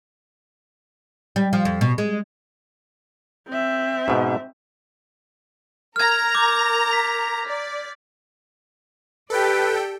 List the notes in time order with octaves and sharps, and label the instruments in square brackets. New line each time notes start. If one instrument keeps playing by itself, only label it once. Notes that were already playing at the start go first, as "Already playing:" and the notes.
[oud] G3
F3
F2
B2
G#3
[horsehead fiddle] C4 E5
[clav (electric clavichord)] G#2 B2
[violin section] A#4 A#5 [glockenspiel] F6 G#6
[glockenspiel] D6 G6
B6
[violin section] D5
[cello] G4 D5 [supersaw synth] A4 G5 [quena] B4